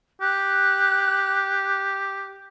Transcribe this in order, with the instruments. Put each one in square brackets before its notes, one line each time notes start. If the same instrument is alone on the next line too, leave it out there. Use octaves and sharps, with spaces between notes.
[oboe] G4 [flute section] F#6